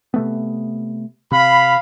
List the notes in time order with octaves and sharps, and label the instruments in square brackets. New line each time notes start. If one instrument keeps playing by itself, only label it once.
[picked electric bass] C3 A3 B3
[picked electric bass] C3 [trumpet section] F5 B5